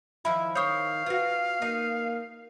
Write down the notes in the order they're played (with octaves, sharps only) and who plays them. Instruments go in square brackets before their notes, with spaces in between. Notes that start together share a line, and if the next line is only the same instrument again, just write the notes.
[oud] D#3 F3 E4 [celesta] B5
[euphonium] D#3 [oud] C5 C#5 [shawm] F5 [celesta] C#6 D#6 G6
[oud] F4 F#4 [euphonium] B4
[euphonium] A#3 [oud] D#4